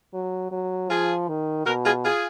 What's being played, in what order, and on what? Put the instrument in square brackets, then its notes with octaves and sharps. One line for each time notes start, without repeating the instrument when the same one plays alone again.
[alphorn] F#3
F#3
[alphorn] F3 [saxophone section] F4 G#4
[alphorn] D#3
[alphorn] B2 [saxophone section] F#4 A#4
[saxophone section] F4 G#4
F4 G#4